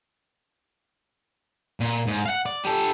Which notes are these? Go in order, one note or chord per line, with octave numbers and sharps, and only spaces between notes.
A#2
G#2
F5 F#5
D5
G4 A4